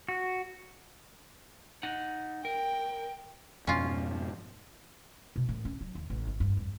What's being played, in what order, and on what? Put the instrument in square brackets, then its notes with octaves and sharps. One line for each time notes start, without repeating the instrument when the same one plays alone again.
[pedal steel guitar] F#4
[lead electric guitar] D#4 F#5
[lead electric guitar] A#4 [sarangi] G5
[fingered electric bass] F2 G#2 B2 [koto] C#4 F4
[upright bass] B2
A1
C#4
F#3
D#2
A1
G#1
G2
F2